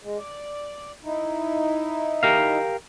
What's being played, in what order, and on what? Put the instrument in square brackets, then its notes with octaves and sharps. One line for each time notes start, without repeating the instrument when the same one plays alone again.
[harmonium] G#3
D5
D#4 E4
[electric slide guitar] G4 A#4 F5